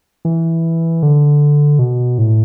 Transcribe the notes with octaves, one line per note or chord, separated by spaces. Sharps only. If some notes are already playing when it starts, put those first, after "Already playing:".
E3
D3
B2
A2